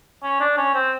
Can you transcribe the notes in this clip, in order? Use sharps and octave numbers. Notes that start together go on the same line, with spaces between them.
C#4
D4
C#4
C4